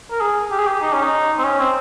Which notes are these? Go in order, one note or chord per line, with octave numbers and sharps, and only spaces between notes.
A#4
G#4
G4
G#4
G4
D#4
C#4
D#4
C4
C#4
C4